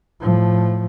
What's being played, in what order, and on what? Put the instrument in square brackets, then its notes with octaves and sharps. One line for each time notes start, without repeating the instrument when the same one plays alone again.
[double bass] A2 F3